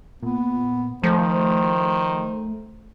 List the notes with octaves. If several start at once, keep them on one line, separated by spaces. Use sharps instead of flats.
A#2 B3
D#3 F3 A3 C5